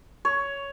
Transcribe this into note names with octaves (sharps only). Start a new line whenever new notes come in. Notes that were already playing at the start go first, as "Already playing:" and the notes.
C#5